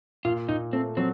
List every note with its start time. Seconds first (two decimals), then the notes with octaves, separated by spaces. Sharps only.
0.25 A#2 F4
0.49 A#2 D#4
0.73 A3 C4
0.97 F#3 C4